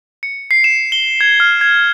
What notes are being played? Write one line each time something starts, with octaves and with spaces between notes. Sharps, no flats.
C#7
C7
E7
G7
G#6
F6
G#6